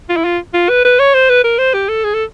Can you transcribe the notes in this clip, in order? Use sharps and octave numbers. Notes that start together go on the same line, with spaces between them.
F4
E4
F4
F4
B4
B4
C#5
C5
B4
A#4
C5
G4
A4
G#4
A4